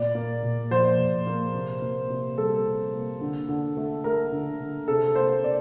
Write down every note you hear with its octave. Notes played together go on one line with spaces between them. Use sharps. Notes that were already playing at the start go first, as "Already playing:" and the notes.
Already playing: A#2 D5
A#3
A#2
F3 C5
A#2
A#3
C3
A#3
C3
G3 A4
C3
A#3
D3
D3
A3
A3 A#4
D3
D3
C3 A4
A#3 C5
C3 D5